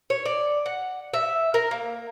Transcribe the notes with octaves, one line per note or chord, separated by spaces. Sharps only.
C#5
D5
F#5
E5
A#4
A#3